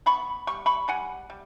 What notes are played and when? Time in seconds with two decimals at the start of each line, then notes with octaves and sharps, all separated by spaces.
0.06 B3 B5 C#6
0.47 G3 C#6
0.66 B5 C#6
0.88 G3 F#5 G#5
1.30 G3